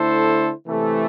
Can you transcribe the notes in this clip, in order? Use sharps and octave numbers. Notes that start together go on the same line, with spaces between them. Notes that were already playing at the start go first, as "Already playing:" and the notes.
Already playing: D3 A3 E4 A4 C5
C3 E3 A3